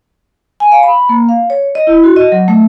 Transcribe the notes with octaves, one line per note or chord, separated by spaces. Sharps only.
G#5
F5
B5
A#3
F5
C#5
D#5
E4
F#4
D#5
F#3
A3